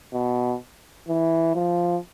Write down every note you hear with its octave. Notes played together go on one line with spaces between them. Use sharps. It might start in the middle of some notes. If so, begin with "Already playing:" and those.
B2
E3
F3